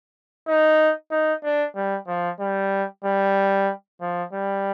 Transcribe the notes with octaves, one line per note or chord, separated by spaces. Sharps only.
D#4
D#4
D4
G3
F3
G3
G3
F3
G3